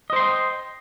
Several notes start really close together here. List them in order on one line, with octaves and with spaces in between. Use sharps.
D#5 C5 C6 G5